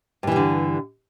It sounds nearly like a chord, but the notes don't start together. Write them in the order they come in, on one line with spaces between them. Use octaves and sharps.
G2 E3 G3 D3